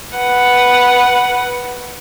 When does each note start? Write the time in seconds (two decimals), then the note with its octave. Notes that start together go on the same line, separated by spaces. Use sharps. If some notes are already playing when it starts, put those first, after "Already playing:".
0.16 B4 F#5